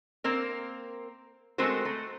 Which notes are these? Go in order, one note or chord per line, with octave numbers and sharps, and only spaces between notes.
A#3 C4 A#4
G#3 A3 C4 F#4 A#4 C5
A3